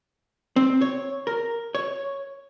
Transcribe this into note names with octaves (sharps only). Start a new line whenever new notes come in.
C4
C#5
A#4
C#5